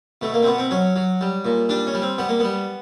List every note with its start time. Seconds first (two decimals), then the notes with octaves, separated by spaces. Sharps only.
0.21 B2 A3
0.34 A#3
0.43 C4
0.46 B2 B3
0.58 C4
0.71 F#3 C#4
0.96 F#3
1.21 G3
1.45 A#2
1.69 G3 D4
1.87 C#4
1.94 G3
2.02 C4
2.18 G3 B3
2.29 A#3
2.40 G3 B3